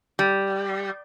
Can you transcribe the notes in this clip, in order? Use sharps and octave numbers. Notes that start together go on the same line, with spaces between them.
G3